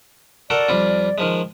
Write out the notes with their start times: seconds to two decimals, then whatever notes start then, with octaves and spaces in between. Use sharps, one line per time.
0.50 F#4 A4 A#4 D5
0.69 F2 G3 F4
1.18 D#3 F3 G#3